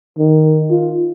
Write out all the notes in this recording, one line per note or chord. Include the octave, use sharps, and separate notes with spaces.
D#3
F4